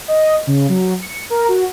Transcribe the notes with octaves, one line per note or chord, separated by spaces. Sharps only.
D#5
C#3
F#3
C#7
A#4
F#4